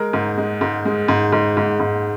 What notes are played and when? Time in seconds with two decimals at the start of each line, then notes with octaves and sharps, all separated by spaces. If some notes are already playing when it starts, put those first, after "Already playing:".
Already playing: G#3 A#4
0.13 G#2
0.38 G#3
0.61 G#2
0.85 G#3
1.08 G#2
1.32 G#2
1.57 G#2
1.80 G#2